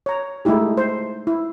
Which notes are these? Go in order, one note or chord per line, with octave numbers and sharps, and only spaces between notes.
C#5 A#5
G#3 A3 D#4 E4 G4
C5
E4